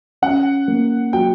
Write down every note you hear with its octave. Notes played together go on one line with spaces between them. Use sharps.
C#4 F#5
A#3
F#3 G5